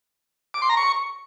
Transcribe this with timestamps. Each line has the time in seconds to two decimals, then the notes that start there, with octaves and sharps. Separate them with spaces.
0.54 D6
0.62 C6
0.70 A#5
0.77 C#6